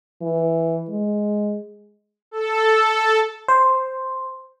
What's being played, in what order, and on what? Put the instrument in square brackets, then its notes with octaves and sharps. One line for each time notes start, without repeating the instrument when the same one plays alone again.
[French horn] E3
G#3
[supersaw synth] A4
[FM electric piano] C5